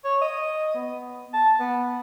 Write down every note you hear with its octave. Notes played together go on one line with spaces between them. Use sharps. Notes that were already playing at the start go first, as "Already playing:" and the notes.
C#5
D#5
B3
A5
B3